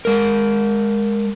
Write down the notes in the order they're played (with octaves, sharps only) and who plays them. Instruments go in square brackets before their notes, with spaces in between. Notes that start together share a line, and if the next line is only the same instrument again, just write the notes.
[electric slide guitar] G#3 A#4